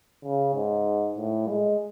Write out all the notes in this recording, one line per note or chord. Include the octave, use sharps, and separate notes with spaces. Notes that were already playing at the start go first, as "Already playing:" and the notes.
C#3
G#2
A2
G#3